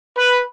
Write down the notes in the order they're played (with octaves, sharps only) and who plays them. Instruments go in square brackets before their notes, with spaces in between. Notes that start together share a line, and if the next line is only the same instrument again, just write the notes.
[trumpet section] B4